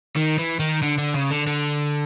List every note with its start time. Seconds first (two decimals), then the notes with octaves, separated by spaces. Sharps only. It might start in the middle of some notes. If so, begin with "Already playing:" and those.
0.17 D#3
0.39 E3
0.59 D#3
0.82 D3
0.98 D3
1.14 C#3
1.31 D3
1.47 D3